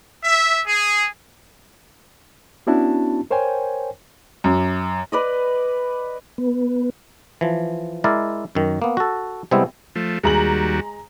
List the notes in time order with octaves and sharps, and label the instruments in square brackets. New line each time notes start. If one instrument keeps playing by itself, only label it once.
[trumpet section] E5
G#4
[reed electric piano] B3 C#4 D4 E4 F#4 A5
A#4 C5 C#5 G5 G#5
[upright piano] F#2
[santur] B4 D5 D#5
[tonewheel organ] B3
[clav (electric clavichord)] E3 F3
G#3 E4 A#4 D5
F#2 D#3
A#3 B3
F#4 A4
C3 G3 G#3 B3 C4 E4
[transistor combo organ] F3 A3
[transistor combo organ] D#2 G3 F#4 [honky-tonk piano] G#3 A#5 F#7